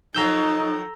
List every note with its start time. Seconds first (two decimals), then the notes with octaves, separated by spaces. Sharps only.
0.15 D#3 F3 F#3 D#4 A4 A#5 E6 G6